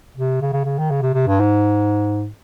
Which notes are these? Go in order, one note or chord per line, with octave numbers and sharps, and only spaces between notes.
C3
C#3
C#3
C#3
D#3
C#3
C3
C3
G2
G#2